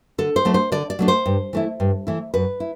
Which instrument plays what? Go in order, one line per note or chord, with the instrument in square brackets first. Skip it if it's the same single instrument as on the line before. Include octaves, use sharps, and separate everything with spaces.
[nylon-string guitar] D3 A4
C5
F#3 A3 D4
C5
D3 D5
D5
F#3 A3 D4
C5
G2
E3 A3 E4
G2
E3 A3 E4
F#2 B4
E4